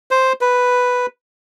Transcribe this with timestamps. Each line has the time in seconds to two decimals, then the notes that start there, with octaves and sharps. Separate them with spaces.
0.11 C5
0.41 B4